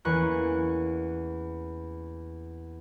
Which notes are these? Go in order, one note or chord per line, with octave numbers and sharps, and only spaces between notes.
E2 A#3 C#4 C#6 F#6